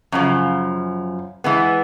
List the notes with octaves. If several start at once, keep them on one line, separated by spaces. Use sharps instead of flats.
F#2 C#3 F3
E3 G#3 B3